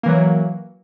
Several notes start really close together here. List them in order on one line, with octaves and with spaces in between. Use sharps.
A#3 E3 F#3